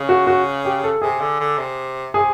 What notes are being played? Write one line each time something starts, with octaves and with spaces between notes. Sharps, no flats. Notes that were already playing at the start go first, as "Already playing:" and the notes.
Already playing: C#3
F#4
F#4
G4
A4
C3 G#4
D3
D3
C3
C3 G#4